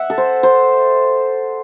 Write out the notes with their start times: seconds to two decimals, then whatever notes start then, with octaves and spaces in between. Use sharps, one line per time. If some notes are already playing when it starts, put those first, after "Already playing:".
Already playing: E5 F#5
0.10 A4
0.18 C5
0.43 C5